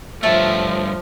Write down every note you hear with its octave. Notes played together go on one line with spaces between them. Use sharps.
G2 F3 A3 C#5 E5 A5